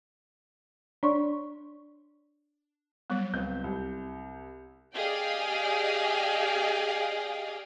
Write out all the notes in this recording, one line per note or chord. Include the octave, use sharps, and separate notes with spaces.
D4 C#5 D5 C6 C#6
F#3 G3 B3
C#2 C4 G6
C2
G4 G#4 D5 D#5 F5 G5